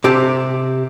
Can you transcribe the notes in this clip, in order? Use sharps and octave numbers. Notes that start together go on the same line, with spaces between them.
C3 G4 A5